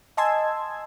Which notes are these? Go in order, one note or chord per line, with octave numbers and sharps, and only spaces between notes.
D#5 G#5 A5 C6 E6 G#6